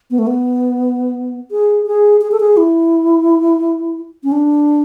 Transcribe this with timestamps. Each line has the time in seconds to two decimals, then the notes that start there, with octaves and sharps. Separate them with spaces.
0.11 B3
0.19 A3
0.27 B3
1.51 G#4
1.86 G#4
2.21 G#4
2.32 A4
2.40 G#4
2.57 E4
4.24 C#4
4.32 D4